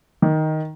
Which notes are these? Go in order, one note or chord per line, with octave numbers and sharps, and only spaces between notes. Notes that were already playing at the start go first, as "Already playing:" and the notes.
D#3